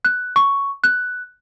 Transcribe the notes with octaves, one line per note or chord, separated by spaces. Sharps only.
F#6
C#6
F#6